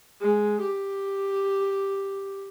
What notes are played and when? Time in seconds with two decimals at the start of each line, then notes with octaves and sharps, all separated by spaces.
0.21 G#3
0.62 G4